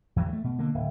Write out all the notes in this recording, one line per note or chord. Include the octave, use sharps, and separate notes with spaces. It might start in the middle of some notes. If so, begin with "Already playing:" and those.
E2 E3 F#3
G3 A3
B2
D3 A#3
D1